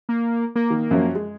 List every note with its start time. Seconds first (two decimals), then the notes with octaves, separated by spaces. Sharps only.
0.09 A#3
0.56 A#3
0.70 D#3
0.91 F#2 F3 C#4
1.15 G#3